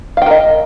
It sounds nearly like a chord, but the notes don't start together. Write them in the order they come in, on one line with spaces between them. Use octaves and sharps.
F5 G5 A#4 D#5